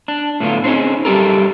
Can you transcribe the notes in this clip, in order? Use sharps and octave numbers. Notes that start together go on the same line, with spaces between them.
D4
A2 D3 B3 F4
C4 C#4 D#4 G#4
F#2 G3 C4 G4 A4 A#4